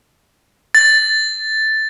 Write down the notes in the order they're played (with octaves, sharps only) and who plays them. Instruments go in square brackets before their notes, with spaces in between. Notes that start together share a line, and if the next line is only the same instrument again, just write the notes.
[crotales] A6